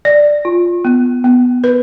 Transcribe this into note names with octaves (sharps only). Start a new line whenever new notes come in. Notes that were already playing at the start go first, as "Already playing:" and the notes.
D5
F4
B3
B3
B4